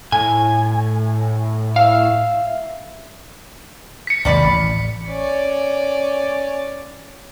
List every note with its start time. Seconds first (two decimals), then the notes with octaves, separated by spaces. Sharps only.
0.12 A2 G#5
1.76 E5 F5
4.07 B6 C#7
4.25 G#1 D#2 C3 G3 D5 B5
4.44 A1
5.09 C#4 D5